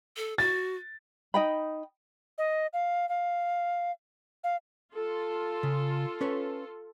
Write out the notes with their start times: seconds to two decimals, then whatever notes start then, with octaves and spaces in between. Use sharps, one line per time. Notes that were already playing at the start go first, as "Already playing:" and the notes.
0.17 A4
0.38 F#4 A6
1.34 D#4 D#5 G5 B5
2.38 D#5
2.73 F5
3.09 F5
4.44 F5
4.94 F4 A4
5.63 C#3
6.21 C#4 B4 C#5